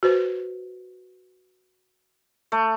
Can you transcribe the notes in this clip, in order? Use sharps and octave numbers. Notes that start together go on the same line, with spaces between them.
F#4 B4 C5
A3